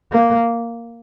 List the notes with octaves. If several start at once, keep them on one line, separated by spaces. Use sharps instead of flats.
A#3